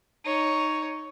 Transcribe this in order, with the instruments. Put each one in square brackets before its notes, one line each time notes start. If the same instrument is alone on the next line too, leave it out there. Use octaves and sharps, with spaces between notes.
[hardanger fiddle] D#4 C#5